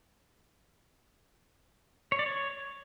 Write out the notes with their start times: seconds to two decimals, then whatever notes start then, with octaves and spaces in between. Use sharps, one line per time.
2.12 C#5
2.19 D5
2.26 C#5